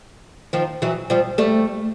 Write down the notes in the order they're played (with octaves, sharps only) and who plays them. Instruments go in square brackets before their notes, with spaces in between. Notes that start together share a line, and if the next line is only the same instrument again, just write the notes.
[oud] D#3 F3
E3 F#3
F3 G3
G3 A3